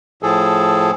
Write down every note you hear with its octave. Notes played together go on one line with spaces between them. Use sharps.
A2 F3 G#4 A4